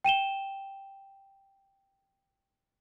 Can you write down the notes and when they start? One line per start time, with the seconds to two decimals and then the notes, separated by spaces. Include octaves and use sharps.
0.04 G5 D#7 E7 G7